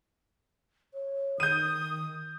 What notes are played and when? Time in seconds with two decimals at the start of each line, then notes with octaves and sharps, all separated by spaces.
0.93 C#5
1.40 D#3 D#6 G6 D#7